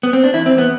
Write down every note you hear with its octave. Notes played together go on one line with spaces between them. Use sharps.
B3
C4
D4
E2 E4
C4
E2
B3